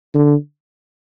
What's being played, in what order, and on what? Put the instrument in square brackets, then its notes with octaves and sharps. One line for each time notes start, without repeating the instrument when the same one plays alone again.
[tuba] D3